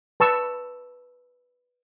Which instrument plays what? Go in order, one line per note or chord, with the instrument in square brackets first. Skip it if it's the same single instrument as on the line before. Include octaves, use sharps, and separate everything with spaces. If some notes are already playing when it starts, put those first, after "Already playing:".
[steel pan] B4 A5 C#6 E6